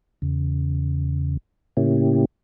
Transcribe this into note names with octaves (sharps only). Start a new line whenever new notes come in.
E2 C#3
A2 C#3 A#3 C#4 E4 G4